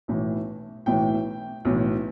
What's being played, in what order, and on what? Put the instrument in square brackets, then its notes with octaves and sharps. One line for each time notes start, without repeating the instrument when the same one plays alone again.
[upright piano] B1 A2 E3
B1 A2 E3 G5
B1 A2 E3